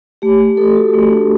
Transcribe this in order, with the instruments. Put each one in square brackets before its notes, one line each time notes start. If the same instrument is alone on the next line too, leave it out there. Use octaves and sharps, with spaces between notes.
[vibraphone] A3 G4
A3
A3 A4
F#4
A3
D4